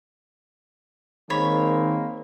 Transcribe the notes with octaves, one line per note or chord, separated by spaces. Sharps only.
D#3 G#3 A#3 C4 C#5 B5